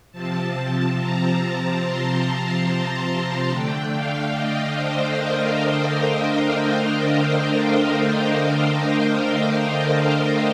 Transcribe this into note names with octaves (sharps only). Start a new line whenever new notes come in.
C3 F3 C4 A5
A#5
A5
C6
A5
D3 A3 D4 G5
F5
D#5
C5
A#4
C5
C5